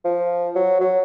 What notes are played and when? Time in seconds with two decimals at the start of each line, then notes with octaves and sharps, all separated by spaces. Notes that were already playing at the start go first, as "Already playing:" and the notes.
0.05 F3
0.55 F#3
0.81 F#3